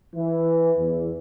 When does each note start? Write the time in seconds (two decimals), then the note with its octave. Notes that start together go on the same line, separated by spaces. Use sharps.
0.14 E3
0.78 E2